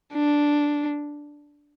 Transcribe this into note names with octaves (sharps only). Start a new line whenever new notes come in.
D4